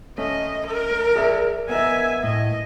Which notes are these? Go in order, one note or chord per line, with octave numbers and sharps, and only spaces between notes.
A3 C#4 D#5
A#4
G#4 D5 E5
B3 A#4 D#5 E5 G#5
A2 D#5